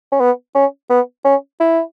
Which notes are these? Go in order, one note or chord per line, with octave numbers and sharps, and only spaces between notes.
C#4
B3
C#4
B3
C#4
E4